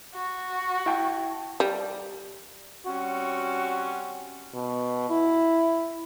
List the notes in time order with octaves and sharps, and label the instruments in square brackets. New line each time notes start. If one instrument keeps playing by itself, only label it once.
[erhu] F#4
[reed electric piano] E4 G5 A5
[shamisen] G3
[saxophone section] G3 C4 C#4 [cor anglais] F#4
[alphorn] B2
E4